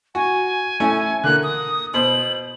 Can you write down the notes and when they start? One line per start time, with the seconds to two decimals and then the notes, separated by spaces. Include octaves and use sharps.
0.15 F#4 G#5
0.80 A3 C#4 E4
1.24 D3 A#3 F#6
1.43 D#6
1.94 B2 C5 F#7